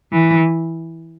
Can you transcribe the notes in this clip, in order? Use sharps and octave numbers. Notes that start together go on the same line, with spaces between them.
E3